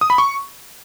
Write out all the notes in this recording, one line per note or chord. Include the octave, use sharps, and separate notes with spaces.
D#6
B5
C#6